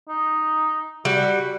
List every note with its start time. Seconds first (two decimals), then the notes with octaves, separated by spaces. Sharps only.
0.09 D#4
1.05 G3 F#4